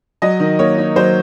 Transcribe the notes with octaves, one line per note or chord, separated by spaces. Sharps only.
F#3 D#5
D#3
A#3 C#5
D#4
F#3 C5